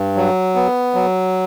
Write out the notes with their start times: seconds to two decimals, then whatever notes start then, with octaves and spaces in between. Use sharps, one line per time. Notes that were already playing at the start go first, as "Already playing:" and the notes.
Already playing: G2
0.17 F#3
0.56 B3
0.95 F#3